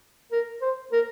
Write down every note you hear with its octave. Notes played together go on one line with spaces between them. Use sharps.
A#4
C5
A#4